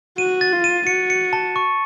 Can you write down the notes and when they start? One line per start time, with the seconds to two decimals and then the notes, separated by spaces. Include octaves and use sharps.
0.18 F#4 D#7
0.41 A6
0.53 F4
0.64 D#7
0.87 F#4 C#7
1.10 C#7
1.33 A5
1.56 C#6